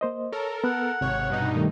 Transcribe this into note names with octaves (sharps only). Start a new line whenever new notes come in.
A#3 C5 D#5
A4 A#4 C#5
B3 F#5
G#1 C3 C#5
G2 B2 D#4
D#3 G3 A3